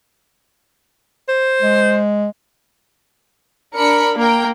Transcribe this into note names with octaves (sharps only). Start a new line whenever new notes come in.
C5
G#3
D4 A#4 B5 C#7
A#3 A#4 G5